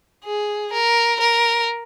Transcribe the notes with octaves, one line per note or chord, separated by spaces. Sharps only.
G#4
A#4
A#4